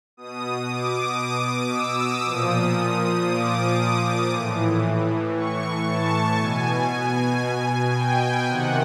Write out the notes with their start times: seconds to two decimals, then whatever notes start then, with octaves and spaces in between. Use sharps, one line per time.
0.17 B2 D#6
0.69 D6
1.73 E6
2.24 A#2 F3 D#6
2.76 D#6
3.28 D6
4.31 A2 E3
5.35 C#6
5.87 A5
6.38 B2 G#5
7.94 G5
8.46 C3 D#3 F#5